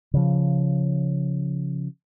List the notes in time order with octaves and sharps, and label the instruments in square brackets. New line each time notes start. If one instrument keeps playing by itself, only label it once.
[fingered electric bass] C#3 F3